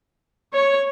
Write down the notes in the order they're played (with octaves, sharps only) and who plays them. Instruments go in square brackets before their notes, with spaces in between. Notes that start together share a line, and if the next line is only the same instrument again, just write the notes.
[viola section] C#5